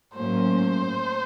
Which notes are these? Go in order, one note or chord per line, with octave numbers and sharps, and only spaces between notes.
A2 F#3 A#3 C#4 C5